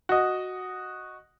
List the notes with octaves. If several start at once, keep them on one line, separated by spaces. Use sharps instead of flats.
F#4 D#5